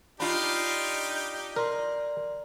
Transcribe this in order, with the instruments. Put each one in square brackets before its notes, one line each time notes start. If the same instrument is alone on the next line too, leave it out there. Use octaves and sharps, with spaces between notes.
[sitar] D4 F4 [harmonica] D#4 G4 [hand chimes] B5 F6
[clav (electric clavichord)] A#4 [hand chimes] D5 C6